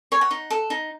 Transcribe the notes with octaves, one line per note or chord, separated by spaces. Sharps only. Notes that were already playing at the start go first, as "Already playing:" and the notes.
C#5 G#5
F#5
D#4
A4
D#4